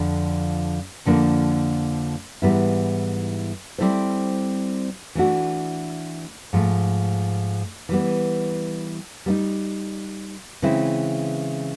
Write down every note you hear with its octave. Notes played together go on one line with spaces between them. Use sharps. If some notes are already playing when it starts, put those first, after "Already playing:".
Already playing: F2 D3 F3 D4
F2 D3 F3 A#3 D4
G#2 E3 G3 B3 E4
G3 C4 E4 A4 C5
E3 A3 D4 F#4
G#2 F3 A3
E3 G3 B3
G3 B3 D#4
C#3 E3 G#3 C4 E4